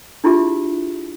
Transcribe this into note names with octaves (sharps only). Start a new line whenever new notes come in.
D4 E4 F4 G4 G#4 E5